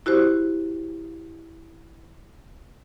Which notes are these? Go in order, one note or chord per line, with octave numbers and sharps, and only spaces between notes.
E4 F#4 G4 C5